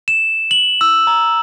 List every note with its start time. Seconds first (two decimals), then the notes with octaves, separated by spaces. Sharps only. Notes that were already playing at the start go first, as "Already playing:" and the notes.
0.08 E7
0.51 F#7
0.81 E6
1.07 A#5